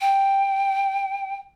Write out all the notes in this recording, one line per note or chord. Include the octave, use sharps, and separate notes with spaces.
G5